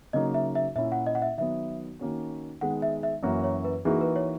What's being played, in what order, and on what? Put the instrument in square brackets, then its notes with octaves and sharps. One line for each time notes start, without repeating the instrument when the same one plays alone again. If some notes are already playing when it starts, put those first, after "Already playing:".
[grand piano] C#3 F#3 A#3 D#4 [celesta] D#5
[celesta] E5
E5
[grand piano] A#2 A#3 C#4 E4 [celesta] E5
[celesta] F#5
D#5
F#5
E5
[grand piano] D#3 F#3 B3 [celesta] E5
[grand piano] D#3 A#3 C#4 F#4
[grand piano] D#3 G#3 B3 [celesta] F#5
[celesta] E5
E5
[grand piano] F#2 E3 A#3 C#4 F#4
[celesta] C#5
B4
[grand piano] E3 A#3 D#4 F#4 [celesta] G#4
[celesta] B4
C#5